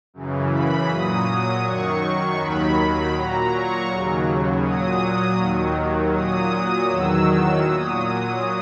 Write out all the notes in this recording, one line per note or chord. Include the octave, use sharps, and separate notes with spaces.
F#2 C#3 E3
B5
A#2 F#3 D#6
F#2 D#3 F#3 C#6
D#2 D#3 F#3 B5
A#2 F#3 A#5
C#6
D#2 C#3 F#3
A#2 F#3 D#6
D#2 D#3 F#3
A#2 F#3 D#6
E2 D#3 F#3 E6
A#2 F#3 D#6